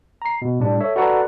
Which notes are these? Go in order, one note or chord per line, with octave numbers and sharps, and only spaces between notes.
A#5 C7
B2
A2 G3 D4
A4 C#5 E5
F#4 A4 B4 D5 F#5 A#5